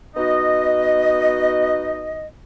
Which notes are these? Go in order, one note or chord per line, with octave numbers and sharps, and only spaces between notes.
B3 D#4 F#4 D#5